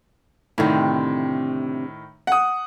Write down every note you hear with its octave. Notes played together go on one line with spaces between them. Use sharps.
D2 A2 C3 D#3
F#5 D#6